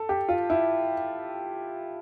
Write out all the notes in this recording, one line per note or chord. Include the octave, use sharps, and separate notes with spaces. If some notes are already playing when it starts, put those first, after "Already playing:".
Already playing: A4
G4
F4
E4